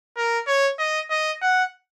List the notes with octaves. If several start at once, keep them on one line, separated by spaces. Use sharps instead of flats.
A#4
C#5
D#5
D#5
F#5